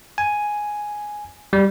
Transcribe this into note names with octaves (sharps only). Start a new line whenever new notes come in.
G#5
G3